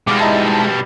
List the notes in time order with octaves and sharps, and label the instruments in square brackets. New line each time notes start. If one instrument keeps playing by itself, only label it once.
[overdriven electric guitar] B2 G3 [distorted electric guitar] G#3 [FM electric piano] F5 D6
[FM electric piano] D#4 E4 A5